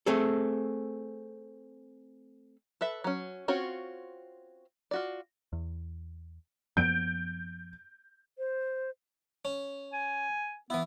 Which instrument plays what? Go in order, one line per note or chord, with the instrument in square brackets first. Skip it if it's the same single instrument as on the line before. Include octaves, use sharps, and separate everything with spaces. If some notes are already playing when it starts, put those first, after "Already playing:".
[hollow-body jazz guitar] A3 C4 G#4 A4
[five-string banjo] A4 B4 E5
F#3 C#4
C4 C#4 F4 F#4 C#5
F4 F#4 D5
[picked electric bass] E2
[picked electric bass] F#2 F3 B3 [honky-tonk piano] G6 D7
[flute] C5
[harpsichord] C#4
[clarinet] G#5
[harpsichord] E3 E4 [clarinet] B3